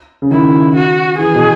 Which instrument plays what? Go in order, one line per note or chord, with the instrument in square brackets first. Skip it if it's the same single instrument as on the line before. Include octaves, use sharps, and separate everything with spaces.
[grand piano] C#3
[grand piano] D#3 [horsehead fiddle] E4
[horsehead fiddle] F#4
[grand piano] E3 [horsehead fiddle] G#4
[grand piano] B2